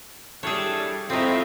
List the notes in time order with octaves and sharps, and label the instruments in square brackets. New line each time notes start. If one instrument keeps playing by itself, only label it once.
[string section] G3 [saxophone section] D4 E4 A4 [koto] G#4 C#5
[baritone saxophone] F2 [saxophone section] A2 [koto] C4 D#4 [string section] F4 D#5 E5